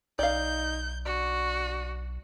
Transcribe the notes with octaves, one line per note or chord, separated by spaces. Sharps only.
B1 D#4 D5 F5 G6
D4 F#4